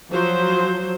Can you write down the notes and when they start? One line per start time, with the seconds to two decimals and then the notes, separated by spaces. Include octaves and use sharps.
0.12 F3 F#3 C5